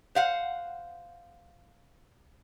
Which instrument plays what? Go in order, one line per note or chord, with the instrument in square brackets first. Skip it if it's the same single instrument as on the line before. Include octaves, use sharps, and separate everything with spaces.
[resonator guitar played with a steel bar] C5 F5 F#5